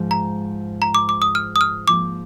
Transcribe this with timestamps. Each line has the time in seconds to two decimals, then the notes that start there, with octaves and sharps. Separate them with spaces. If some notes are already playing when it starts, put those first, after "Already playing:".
Already playing: G#2 F3 G#3
0.11 A#5
0.82 A#5
0.95 D6
1.09 D6
1.22 D#6
1.35 F6
1.56 D#6
1.61 F6
1.88 G#2 F3 A#3 D6